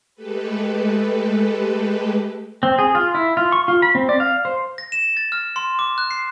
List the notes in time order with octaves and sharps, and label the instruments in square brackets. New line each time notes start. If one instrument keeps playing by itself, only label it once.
[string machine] G#3 A3 G4 A4 B4
[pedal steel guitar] C4
G#4
F4
E4
F4
C#6
F4
B5
C4
D5
F5
C5
[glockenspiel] A#6
E7
A6
F6
C6
D6
F#6
C7